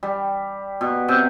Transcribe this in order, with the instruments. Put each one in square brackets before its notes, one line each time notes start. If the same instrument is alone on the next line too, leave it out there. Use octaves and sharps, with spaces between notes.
[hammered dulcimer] G3
B2
C3